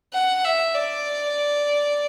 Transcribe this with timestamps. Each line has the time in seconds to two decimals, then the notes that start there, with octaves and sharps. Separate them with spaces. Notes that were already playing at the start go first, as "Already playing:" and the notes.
0.14 F#5
0.45 E5
0.75 D5